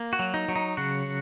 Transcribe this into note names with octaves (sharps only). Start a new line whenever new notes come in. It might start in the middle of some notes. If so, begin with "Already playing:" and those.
Already playing: A#3
F#4
F#3
D#4
F#3
D#4
C#3 F#4